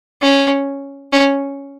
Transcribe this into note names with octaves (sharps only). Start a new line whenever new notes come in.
C#4
C#4